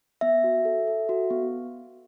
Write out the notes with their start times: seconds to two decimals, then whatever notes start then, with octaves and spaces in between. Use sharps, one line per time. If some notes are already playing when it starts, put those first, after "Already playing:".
0.21 B3 E5
0.44 F#4
0.65 A4
0.87 A4
1.09 F#4
1.30 B3